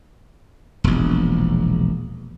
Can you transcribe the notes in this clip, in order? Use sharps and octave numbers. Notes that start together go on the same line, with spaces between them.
E1 A#1